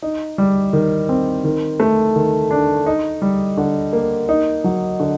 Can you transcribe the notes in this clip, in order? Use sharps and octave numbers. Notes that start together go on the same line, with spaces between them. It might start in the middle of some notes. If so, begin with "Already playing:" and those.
D#4
G3
D#3
C4
D#3
A3
D#3
D4
D#4
G3
D3
A#3
D#4
F#3
D3